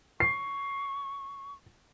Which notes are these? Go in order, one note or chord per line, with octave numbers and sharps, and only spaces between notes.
C#6 C7